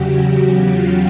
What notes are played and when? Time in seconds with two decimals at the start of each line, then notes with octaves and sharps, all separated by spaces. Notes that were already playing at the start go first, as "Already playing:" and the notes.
Already playing: E2 C#3 F#3 F#4 G4
0.67 F4